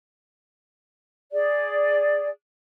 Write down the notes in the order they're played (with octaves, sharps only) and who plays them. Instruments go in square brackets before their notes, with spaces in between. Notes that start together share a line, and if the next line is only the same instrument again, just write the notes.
[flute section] G#4 D5